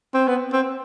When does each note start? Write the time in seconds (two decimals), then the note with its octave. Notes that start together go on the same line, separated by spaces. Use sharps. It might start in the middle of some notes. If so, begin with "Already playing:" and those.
0.14 C4
0.28 B3
0.53 C4